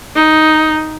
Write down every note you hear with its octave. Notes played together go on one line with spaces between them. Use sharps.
D#4